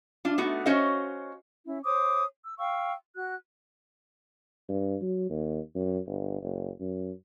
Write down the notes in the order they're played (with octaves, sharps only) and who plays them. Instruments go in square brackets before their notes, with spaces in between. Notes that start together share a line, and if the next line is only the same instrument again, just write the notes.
[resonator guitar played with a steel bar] D4 F4
A3 B3 D#4 F#4
C#4 F#4 C5 C#5 D#5 F5
[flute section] C#4 E4
C5 C#5 D6 D#6
E6
F5 G5 C#6 E6
F#4 F#6
[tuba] G2
F#3
D#2
F#2
G1
F#1
F#2